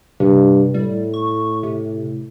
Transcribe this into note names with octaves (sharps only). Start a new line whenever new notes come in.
G2 C3
A2 G3
C#6
C3